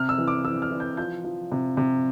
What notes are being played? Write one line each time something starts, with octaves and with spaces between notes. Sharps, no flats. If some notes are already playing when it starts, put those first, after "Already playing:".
Already playing: C3 F6
E6
E3
D6
E3 E6
F6
E3
G6
F3 G6
F3
C3
C3